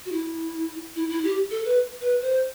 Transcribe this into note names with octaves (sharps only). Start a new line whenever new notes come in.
F#4
E4
E4
E4
G4
A4
B4
B4
C5